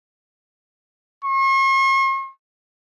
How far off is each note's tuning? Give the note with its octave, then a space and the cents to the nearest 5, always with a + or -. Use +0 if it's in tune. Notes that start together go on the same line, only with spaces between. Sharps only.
C#6 -45